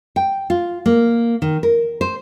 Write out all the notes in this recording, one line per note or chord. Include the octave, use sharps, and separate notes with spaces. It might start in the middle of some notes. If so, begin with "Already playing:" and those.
G5
F4
A#3
D#3
A#4
C5